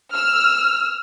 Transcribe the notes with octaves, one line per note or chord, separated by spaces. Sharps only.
E6 F6